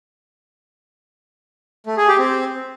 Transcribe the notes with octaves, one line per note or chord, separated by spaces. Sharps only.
A3
G#4
G4
C4